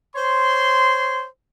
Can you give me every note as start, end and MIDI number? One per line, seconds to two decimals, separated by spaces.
0.16 1.26 72
0.16 1.26 73
0.16 1.26 84